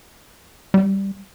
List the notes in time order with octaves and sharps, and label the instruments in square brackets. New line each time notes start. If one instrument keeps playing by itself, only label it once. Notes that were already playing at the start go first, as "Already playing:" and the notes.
[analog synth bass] G3